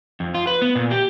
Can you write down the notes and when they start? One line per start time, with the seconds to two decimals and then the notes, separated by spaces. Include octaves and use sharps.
0.20 F2
0.35 F4
0.47 B4
0.62 B3
0.75 A#2
0.91 G4